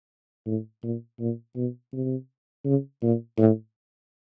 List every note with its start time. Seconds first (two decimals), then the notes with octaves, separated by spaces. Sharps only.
0.47 A2
0.83 A#2
1.20 A#2
1.56 B2
1.93 C3
2.65 C#3
3.02 A#2
3.38 A2